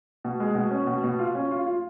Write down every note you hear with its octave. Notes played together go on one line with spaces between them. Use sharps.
B2
G#3
B2
C#4
B2
B2
F4
C#4
F4
F4